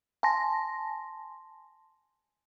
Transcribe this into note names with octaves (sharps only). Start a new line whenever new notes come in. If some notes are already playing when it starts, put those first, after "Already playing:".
G#5 A5 C6 A#6